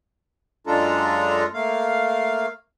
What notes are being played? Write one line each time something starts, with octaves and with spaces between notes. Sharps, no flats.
F#2 G#3 D4 F4 A4 A#5
A3 A#3 F5